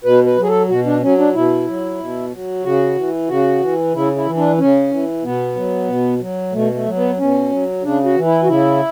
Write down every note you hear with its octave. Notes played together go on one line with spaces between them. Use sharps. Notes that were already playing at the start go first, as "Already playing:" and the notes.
B2 B4
B4
F#3
G#4
A4
B2 F#4
D4
F#3 C#4
D4
B2 E4
F#3
B2
F#3
C#3 F#4
E3
C#3 F#4
E3
C#3 E4
E4
E3
D4
C#3 C#4
E3
B2 B3
F#3
B2
F#3
B2 A3
A3
F#3
B3
B2 C#4
F#3
C#3 D4
F#4
E3
E4
F#4
C#3 E4